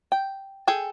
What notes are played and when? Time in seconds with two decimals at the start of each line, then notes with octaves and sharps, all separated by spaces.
0.12 G5
0.67 G#4 A4 G5